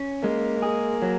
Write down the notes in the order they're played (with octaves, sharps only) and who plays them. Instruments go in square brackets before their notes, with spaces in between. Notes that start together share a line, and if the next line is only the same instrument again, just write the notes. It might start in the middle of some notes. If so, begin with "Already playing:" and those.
Already playing: [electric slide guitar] C#4
[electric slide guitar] G#3 [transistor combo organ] A#3
[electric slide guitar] G#4
F#3